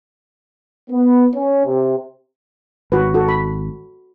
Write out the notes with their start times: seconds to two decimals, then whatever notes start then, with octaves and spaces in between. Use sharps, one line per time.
0.90 B3
1.35 C#4
1.66 C3
2.92 G#1 F#4 B4
3.14 F#4 A4
3.28 B5